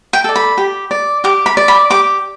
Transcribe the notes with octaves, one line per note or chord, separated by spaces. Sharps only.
G5
A4 D5
B5
G4
D5
G4 D6
B5
D5
B5
G4 D6